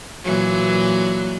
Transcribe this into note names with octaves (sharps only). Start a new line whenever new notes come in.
A#2 E3 F#3